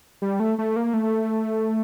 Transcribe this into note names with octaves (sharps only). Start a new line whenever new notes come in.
G3
A3
A3
A#3
A3